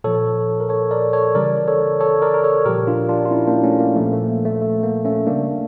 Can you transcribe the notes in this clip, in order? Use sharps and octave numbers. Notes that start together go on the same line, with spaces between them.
A#2 F3 A4 C#5
A#4
A4 C#5
A#4 D5
A4 C#5
C#3 E3 G3 A#4 D5
A4 C#5
A4 C#5
A#4 D5
A#4
A4 C#5
A#2 F3 G4 A#4
D4 F4
D4 F4
F4
C#4 E4
A#3 D4
A3 C#4
A#3
A#2 F3 A3
A3
A#3
A3
A3
A#3
A3 C#4
C#3 G3 A#3 D4